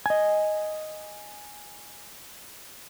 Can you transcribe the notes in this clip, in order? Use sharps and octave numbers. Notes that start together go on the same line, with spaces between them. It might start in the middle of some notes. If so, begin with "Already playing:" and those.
D#5 G#5